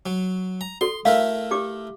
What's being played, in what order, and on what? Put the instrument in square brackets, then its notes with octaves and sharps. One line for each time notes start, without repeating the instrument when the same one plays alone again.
[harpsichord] F#3
A#5
[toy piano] F#4 A4 [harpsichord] C6
[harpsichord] A3 E4 A#4 [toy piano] F5
[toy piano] G4 D6